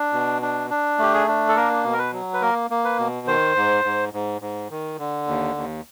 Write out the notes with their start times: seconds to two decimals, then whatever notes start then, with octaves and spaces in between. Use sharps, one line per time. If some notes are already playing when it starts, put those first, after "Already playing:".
Already playing: D4
0.13 B2
0.42 D4
0.70 D4
0.98 A3 G4
1.14 G#4
1.27 D4
1.49 A4
1.56 A#3 A#4
1.84 B2
1.93 A#4
1.99 B4
2.13 F#3
2.33 B4
2.42 A#3 A#4
2.70 A#3
2.85 B4
2.99 B2
3.27 D#3 C5
3.55 G#2
3.85 G#2
4.13 G#2
4.42 G#2
4.70 D#3
4.98 D3
5.27 D#2
5.56 D#2